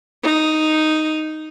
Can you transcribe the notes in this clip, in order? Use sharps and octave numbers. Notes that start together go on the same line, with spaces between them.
D#4